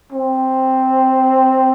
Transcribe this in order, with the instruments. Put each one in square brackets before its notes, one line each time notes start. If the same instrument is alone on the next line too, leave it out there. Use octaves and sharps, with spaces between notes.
[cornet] C4